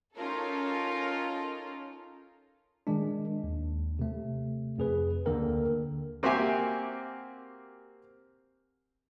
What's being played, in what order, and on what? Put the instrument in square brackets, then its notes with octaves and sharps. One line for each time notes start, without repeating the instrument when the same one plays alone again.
[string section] C#4 D#4 F4 A4 A#4
[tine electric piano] D#3 G#3 D4
D#2
C3 A3
F2 G#4 B4
D2 D3 A#3 A4 A#4 G5
[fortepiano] A#3 C4 F#4 G4 E5 G#5